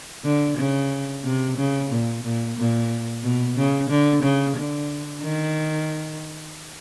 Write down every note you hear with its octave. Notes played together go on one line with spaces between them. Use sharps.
D3
C#3
C3
C#3
A#2
A#2
A#2
B2
C#3
D3
C#3
D3
D#3